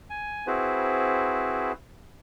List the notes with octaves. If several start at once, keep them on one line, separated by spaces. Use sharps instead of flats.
G#5
C4 E4 F#4 G#4 B4 C5